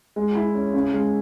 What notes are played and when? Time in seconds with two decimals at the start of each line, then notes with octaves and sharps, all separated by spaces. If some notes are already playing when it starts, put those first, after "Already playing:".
0.16 G#3
0.35 E4
0.54 C#4
0.74 C#3
0.93 G#3